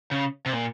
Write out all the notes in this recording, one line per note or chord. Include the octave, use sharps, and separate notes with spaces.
C#3
C3
A#2